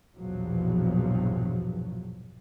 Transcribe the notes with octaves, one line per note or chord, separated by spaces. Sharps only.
A#1 E2 G2 B2 F3 F#3